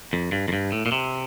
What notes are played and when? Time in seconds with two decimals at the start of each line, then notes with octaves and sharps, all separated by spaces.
0.13 F2
0.32 G2
0.48 F2
0.53 G2
0.72 A2
0.86 A#2
0.92 C3